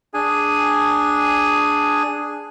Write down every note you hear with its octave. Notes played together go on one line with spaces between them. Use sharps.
D4 G#4 G#5